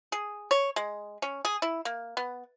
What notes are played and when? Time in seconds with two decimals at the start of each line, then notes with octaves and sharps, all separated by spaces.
0.12 G#4
0.51 C#5
0.76 G#3
1.22 C#4
1.45 G#4
1.62 E4
1.85 A#3
2.17 B3